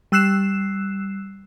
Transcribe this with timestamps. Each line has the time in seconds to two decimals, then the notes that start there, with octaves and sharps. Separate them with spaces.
0.12 G3 E6 F#6 C7 E7